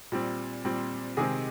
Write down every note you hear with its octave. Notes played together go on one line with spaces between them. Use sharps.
A#2 G3 C4
A#2 G3 C4
C3 D#3 G#3 C4 G#4